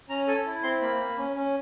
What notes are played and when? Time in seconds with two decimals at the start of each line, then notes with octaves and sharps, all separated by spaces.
0.09 C#4 A#5
0.27 A4 G#5
0.46 E4
0.63 C4 C6
0.82 A#3 B5
0.99 A#3
1.18 C#4
1.36 C#4